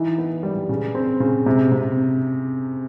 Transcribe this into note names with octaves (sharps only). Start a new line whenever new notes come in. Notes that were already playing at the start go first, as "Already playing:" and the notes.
Already playing: E3 D#4
B3
G3
C#3
C4
C#3
C3
C3